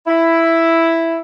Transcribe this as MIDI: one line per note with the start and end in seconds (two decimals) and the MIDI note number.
0.07 1.18 64